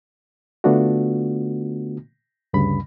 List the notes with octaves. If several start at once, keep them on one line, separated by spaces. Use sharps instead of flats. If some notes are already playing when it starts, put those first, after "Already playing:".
D3 A3 B3 D4 F4 F#4
D2 G2 C#3 B5